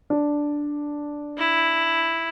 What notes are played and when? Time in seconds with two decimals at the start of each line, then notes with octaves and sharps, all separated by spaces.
0.10 D4
1.37 E4